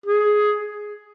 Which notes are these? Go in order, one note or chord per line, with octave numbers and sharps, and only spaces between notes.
G#4